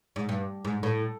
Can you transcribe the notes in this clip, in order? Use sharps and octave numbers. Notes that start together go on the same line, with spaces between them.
G#2
G2
G#2
A2